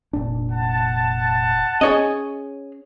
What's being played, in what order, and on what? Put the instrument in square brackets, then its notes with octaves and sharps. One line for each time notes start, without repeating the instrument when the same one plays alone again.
[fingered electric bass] F1 A#2 D4
[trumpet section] F#5 A5
[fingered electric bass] C#4 [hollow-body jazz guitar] G#4 C#5 D#5